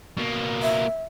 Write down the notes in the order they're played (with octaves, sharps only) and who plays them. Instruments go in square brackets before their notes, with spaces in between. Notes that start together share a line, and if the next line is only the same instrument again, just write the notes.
[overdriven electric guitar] B2 A#3
[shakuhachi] E5